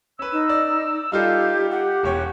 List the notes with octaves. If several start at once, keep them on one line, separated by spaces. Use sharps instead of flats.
C#4 B4 E6
D#4
D5
G3 D#4 F4 G4 A4 F5
G4 F#5
E1 C#5 G5